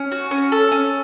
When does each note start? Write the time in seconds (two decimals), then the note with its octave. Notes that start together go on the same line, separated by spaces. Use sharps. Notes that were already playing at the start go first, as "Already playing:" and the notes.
Already playing: C#4
0.12 F#4
0.31 C#4
0.52 A4
0.72 C#4